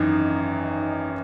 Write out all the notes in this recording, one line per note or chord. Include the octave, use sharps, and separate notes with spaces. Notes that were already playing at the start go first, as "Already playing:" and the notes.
Already playing: G#1 F#2 E3 D#4